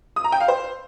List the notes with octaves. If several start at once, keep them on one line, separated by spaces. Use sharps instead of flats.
D#6
A#5
G5
F5
C5